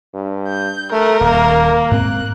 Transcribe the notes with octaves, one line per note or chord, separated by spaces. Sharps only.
G2
G6
A3 A#4
D#1 A#3
G#2 C4 F#6